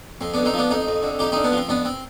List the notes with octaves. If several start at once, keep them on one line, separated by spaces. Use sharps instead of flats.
F2 C4
D3 B3 D4
C4 D#4
F3 B3 D4
F2 C4 D#4
F2
D3
F2 D#4 G4
D3 C4 D#4
B3 D4
F3 C4
F2 B3 D4
C4